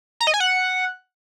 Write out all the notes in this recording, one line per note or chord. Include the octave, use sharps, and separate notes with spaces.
A#5
D#5
G#5
F#5